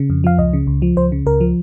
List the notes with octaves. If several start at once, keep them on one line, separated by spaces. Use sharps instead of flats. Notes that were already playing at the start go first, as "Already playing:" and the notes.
Already playing: C#3
F2
F3 F5
C#2 D#5
C#3
C#2
F3
C#2 C5
C#3
C#2 A#4
F3